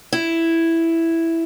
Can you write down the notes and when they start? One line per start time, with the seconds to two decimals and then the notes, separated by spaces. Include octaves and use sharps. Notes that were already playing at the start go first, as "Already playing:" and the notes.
0.13 E4